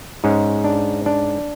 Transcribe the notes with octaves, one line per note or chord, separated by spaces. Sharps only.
G#2 G#3 C#4
D4
D4